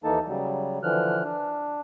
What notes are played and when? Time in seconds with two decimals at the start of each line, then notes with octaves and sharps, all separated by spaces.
0.04 D#2 E3 A#3 D#4 A4 A5
0.27 C#3 F#3 G3
0.83 D3 E3 F3 F6 F#6
1.24 D4